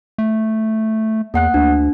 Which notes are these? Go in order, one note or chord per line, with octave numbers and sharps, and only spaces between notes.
A3
E2 A#3 F#5 F#6
D2 D4